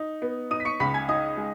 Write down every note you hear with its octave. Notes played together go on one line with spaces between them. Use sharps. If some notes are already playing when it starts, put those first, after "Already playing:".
Already playing: D#4
B3
D#4 D#6 D#7
B6
C#6 C#7
C#2 B5 B6
G#5 G#6
D#4 D#5 D#6
G#3